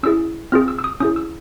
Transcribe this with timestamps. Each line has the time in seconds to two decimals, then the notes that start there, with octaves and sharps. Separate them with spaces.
0.03 C#4 E4 G#4 E6
0.52 C4 F4 G#4 F6
0.68 E6
0.79 E6
0.84 D#6
1.00 C#4 E4 G#4 D#6
1.16 E6